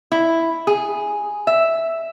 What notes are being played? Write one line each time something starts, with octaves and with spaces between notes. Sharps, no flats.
E4
G#4
E5